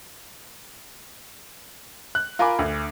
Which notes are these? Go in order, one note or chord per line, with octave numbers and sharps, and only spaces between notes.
F#6
F4 A#4 G#5 B5 D6
D2